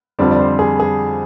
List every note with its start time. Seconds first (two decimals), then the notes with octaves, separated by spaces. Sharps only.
0.19 F2 D3 G3 C4 D5
0.31 D5
0.39 C5
0.59 G#4
0.80 G#4